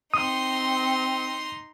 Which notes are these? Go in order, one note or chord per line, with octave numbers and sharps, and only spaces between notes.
C4 D#4 C6 D#6